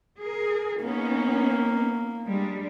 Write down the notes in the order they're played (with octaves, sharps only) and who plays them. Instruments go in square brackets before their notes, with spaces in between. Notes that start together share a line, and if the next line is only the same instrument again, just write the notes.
[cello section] G#4 A#4
[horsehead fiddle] A#3 [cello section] B3 C#4 D#4
[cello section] G3 G#3 D4